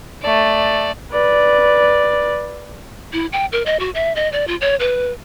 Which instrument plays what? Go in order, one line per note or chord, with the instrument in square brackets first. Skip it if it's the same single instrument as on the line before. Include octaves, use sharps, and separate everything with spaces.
[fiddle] A3 D5
[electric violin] B4 D5
[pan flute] E4
G5
A#4
D#5
F#4
E5
D#5
D5
F4
C#5
B4